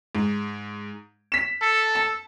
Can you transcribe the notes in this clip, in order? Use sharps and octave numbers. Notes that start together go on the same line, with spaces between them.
G#2
B6 E7
A4
A5